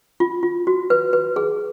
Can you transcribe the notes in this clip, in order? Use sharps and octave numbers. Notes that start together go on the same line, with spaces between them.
F4
F4
F#4
B4
B4
G#4